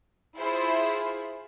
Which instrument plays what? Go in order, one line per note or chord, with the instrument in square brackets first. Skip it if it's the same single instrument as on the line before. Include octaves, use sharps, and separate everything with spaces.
[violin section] E4 F4 G#4 C5 B5